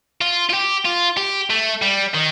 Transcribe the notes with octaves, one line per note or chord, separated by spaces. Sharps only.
F4
F4
G4
F4
G4
A3
G3
D#3